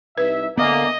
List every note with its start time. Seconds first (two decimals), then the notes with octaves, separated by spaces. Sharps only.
0.18 C2 D#4 B4 E5
0.58 D3 A#3 B3 D#5 E5 G#5